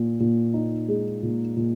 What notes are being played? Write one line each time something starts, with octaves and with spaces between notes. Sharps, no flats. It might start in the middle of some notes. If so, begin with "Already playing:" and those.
Already playing: A#2
A#2
D#4
G#3
A#2
A#2